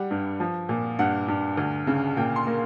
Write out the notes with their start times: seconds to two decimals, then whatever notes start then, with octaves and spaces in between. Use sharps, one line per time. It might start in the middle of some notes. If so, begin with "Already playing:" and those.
Already playing: G3 F#5
0.11 G2
0.40 F3
0.69 A#2
0.99 G2 F#5
1.28 G2
1.57 D2
1.87 C#3
2.17 A#2 G5
2.36 C6
2.47 A#3